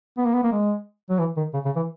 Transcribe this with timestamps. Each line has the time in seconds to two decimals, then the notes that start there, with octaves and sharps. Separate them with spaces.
0.18 B3
0.25 A#3
0.34 B3
0.43 A#3
0.52 G#3
1.10 F#3
1.19 E3
1.37 D#3
1.54 C#3
1.65 C#3
1.76 E3